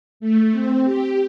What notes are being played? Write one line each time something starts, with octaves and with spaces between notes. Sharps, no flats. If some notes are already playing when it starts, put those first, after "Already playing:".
A3
C4
G4